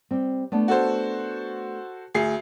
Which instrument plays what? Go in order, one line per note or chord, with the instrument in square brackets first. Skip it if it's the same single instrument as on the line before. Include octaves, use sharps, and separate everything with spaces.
[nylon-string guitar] G3 C4
A3 B3 D4
[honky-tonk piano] F#4 A4 C5
D2 G#4 C7